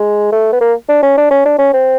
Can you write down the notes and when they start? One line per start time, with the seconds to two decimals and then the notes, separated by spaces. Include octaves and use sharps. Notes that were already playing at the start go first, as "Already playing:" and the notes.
Already playing: G#3
0.32 A3
0.52 B3
0.61 A#3
0.89 D4
1.03 C#4
1.17 D4
1.31 C#4
1.45 D4
1.58 C#4
1.74 C4